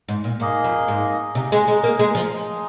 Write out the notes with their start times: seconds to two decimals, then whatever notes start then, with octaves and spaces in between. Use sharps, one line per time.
0.09 G#2
0.24 A#2
0.40 G#2 A#3 G#4 D#5
0.64 F2
0.88 G#2
1.35 C3 D#4
1.38 G#4 D#5
1.52 G#3
1.68 G#3
1.84 A#3
1.99 G#3
2.15 F3
2.32 G#3 D#4 G#4